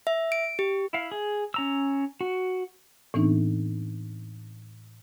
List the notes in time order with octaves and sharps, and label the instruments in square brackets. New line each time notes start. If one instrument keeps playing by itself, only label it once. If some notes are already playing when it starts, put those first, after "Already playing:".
[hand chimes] E5
D7
G4
[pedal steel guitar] E4 F5
G#4
C#4 A#5 E6
F#4
[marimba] A2 E3 B3 C4 D4 D#4